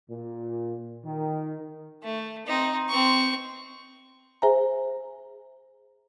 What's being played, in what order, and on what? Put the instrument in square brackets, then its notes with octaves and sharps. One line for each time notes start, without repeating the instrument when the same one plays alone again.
[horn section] A#2
D#3
[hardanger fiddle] A3
C4 D#4
C4 C#6
[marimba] G#4 C5 E5 G#5 A#5